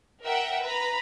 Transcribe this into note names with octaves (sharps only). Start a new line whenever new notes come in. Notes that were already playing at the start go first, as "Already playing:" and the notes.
A#4 E5 F#5 G5
B4 A#5 B5